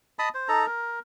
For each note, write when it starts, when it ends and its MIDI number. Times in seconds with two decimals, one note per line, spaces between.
0.19 0.29 75
0.19 0.29 81
0.19 0.29 83
0.19 0.29 87
0.34 0.48 72
0.48 0.66 63
0.48 0.66 69
0.48 0.66 82
0.66 0.99 70